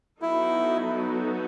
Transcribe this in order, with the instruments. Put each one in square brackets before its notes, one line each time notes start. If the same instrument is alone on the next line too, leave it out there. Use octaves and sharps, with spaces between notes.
[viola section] F#3 B3 D#4 F#4 A4 [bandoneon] E4